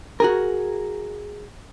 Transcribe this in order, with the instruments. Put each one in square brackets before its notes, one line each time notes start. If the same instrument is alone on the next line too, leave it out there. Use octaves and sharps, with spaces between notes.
[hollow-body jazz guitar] F#4 G#4 A#4